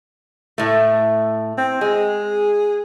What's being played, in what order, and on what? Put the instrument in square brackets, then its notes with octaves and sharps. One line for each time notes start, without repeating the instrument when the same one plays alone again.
[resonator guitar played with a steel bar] A2 A3
[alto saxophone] C4
[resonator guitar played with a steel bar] G#3 [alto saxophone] G#4